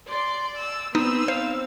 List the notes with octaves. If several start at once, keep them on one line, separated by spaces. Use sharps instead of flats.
D5 C6
E6
B3 C4 D#4 E6
C5 F5